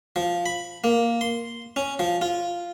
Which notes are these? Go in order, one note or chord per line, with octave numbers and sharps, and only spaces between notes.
F3
B5
A#3
C6
C#4
F3
F4